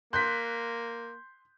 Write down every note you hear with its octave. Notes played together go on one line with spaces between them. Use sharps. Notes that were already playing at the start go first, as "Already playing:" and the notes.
A#3 C6 F#6 G6 B6